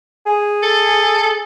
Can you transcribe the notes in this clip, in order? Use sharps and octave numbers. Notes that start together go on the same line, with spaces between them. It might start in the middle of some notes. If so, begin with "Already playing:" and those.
G#4
A4